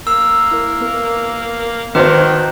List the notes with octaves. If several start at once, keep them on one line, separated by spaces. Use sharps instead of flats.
A#3 E6
E4 A#4
B3 A#4
G#1 D#3 B4 C5 D6 G6